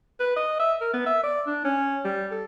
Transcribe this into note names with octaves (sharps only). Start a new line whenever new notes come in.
B4
D#5
E5
A#4
B3
E5
D5
D4
C#4
G3
A4